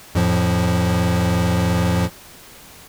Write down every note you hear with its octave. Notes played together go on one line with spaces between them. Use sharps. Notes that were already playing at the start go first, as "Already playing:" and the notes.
F2 A2 F3